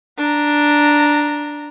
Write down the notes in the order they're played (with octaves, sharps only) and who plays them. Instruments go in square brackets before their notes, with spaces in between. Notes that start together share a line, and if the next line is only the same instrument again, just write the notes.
[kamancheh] D4 A#5